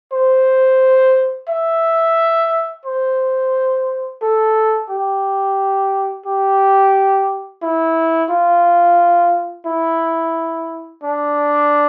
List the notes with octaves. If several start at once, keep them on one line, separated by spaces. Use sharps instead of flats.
C5
E5
C5
A4
G4
G4
E4
F4
E4
D4